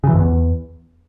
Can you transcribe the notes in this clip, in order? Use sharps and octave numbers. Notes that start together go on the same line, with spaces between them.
C#3
E3
F2
E2